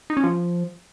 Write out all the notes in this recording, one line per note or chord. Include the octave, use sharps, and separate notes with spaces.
D#4
C#4
F3